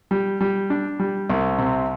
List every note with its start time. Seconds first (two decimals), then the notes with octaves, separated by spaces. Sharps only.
0.11 G3
0.41 G3
0.70 D4
0.99 G3
1.30 C2
1.58 C3